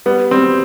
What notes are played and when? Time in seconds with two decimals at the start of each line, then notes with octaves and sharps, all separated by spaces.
0.06 G3 B3
0.31 G3 C4